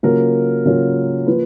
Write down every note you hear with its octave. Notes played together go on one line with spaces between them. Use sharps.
C#3 F#3 A#3 C#4 F4 A#4
C#3 F#3 A#3 C#4 F4
F3 A#3 B4